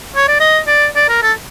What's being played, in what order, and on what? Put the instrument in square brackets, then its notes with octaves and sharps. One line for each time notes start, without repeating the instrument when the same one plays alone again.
[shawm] C#5
D5
D#5
D5
D5
A#4
A4